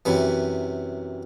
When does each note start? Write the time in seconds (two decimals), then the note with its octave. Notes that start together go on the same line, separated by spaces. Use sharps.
0.05 F#2 C3 E3